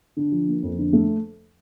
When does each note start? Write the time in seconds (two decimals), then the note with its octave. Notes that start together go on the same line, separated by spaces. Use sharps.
0.17 D3
0.32 F3
0.48 A#3
0.63 F2
0.79 D3
0.93 A3